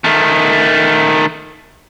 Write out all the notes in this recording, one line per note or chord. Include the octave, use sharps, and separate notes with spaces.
D#3 A3